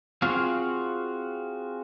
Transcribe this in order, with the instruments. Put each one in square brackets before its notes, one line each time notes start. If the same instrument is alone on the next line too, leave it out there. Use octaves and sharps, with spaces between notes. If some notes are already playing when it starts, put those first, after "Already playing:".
[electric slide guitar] C4 F4 F#4 G#4 F5